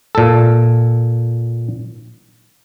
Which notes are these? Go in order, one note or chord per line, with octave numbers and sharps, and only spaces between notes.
A#2 A4